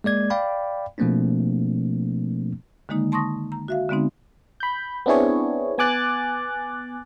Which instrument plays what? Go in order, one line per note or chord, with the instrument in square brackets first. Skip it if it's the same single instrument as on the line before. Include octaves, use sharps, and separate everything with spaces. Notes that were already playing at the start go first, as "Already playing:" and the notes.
[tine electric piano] G#3 A#3 D5 G#6
D5 F5 G5 B5
B2 F3 A3 A#3 C4 D4
[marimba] D3 D#3 G#3 A#3 D#4
A5 C6 C#6 D#6 A#6
A#5
F#4 E5 F5
D3 G#3 B3 C4 D#4
[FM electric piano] B5 G6
B3 C4 D4 E4 G#4 C#5
B3 G#5 D6 F#6 A6